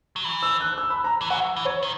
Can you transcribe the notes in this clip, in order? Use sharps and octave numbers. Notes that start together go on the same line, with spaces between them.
F#3
E3
E6
F#6
F#6
E6
B5
A#5
E3
F#3 F#5
E3
C#5
D#3